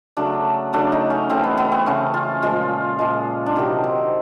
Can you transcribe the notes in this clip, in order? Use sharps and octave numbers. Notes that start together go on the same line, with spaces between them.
C#3 F#3 A3 D4
C#3 F#3 A3 D4
D#4
C#4
C#3 E3 A3 C4
B3
B3
C4
C#3 E3 A3 C#4
F4
A#2 F3 G#3 F4
A#2 F3 G#3
D4
C3 D#3 F#3 D#4
C4